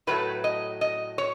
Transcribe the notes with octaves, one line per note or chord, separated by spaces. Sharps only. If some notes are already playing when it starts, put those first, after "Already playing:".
A2 F#3 A3 B4
D#5
D#5
C#5